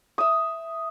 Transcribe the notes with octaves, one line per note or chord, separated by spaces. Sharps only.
E5 D#6